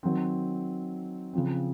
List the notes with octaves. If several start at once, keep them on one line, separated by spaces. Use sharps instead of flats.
D#3 F#3 C4
C#3 F3 C4